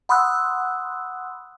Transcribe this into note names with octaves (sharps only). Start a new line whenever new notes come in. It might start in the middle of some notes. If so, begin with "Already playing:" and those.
F#5 B5 C6 D#6 E6 F#6